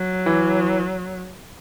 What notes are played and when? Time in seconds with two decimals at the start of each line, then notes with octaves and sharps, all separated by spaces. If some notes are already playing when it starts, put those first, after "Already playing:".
Already playing: F#3
0.26 E3